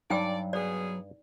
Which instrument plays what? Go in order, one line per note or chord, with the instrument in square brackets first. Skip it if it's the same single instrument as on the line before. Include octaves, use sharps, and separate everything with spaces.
[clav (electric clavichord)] G2 G#5 [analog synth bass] F#3 [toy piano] D#4 G5 E6 [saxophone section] D5
[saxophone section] B2 B3 G#4 [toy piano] D5